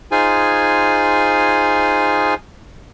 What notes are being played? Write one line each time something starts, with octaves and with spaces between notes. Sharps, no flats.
D#4 F4 G#4 C5 G#5